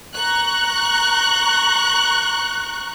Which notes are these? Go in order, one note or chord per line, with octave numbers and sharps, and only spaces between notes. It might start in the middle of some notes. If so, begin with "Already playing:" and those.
A#5 C#6 F#6